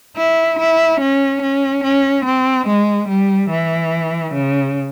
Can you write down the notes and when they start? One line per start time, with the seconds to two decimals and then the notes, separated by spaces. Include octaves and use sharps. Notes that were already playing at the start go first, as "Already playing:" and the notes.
0.17 E4
0.59 E4
1.00 C#4
1.42 C#4
1.84 C#4
2.25 C4
2.67 G#3
3.08 G3
3.50 E3
4.34 C#3